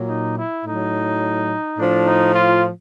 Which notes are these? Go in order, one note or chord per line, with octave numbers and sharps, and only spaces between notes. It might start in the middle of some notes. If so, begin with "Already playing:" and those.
Already playing: A#2 F#3
D#4
E4
A2 F#3 D#4
A2 F3 D4
D#4
F4